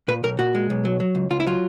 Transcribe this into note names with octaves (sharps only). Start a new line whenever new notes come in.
A#2 B4
B1 A#4
A#2 F#4
G#3
B1
F#3
F#3
C#2
C#2 F4
E4
F#3 F4